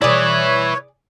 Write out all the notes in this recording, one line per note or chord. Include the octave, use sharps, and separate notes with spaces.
B2 G3 E4 G#4 B4 C#5 D5